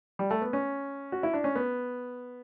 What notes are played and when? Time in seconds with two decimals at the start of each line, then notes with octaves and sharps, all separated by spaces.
0.19 G3
0.31 A3
0.42 B3
0.53 C#4
1.12 F#4
1.23 E4
1.33 D4
1.44 C#4
1.55 B3